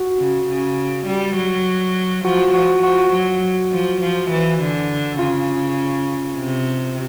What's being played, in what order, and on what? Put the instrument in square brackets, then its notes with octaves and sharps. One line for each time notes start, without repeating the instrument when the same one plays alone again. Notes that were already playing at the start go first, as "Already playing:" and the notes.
Already playing: [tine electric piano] F#4
[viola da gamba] C#3
C#3
G3
F#3
[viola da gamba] F3 [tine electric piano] F#4
[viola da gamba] F3 [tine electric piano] F#4
[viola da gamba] F3 [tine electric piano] F#4
[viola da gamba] F#3
F3
F3
E3
D3
[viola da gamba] C#3 [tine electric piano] F4
[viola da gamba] C3